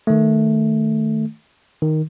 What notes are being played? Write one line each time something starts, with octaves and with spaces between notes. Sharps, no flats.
D#3 A3
D#3